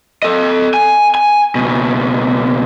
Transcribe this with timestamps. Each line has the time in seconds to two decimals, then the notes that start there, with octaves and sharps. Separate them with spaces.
0.23 A4 D#5
0.74 G#5
1.15 G#5
1.55 C#2 B2